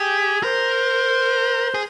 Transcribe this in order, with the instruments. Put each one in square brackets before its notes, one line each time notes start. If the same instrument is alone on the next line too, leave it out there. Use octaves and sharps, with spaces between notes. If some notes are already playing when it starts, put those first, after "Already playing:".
Already playing: [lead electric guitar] G4 [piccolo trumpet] G#4
[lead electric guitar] A#4 [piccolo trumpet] C5
[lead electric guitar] G#4